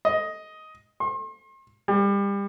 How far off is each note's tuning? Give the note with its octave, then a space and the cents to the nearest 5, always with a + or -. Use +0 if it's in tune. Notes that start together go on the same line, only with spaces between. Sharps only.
D#5 +10
C6 +40
G3 +30